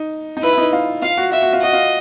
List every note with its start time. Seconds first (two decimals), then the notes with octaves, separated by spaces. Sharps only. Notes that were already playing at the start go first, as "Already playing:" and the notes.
Already playing: D#4
0.37 D#4
0.43 E4 B4
0.53 E4
0.58 D#4
0.73 F4
1.02 F4 F5
1.17 F#4
1.32 F4 E5
1.42 F#4
1.53 F4
1.62 F#4 D#5
1.73 F4